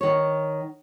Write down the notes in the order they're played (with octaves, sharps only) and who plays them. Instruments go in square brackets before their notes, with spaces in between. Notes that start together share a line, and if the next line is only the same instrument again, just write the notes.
[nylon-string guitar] D#3 C#5